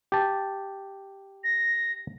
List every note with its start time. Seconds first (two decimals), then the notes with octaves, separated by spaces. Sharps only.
0.12 G4 A5
1.43 A#6